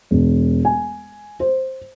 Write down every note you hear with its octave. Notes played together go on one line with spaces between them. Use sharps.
E1
G#5
C5